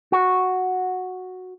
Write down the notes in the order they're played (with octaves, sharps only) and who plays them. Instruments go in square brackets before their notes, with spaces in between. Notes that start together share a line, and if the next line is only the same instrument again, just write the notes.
[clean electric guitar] F#4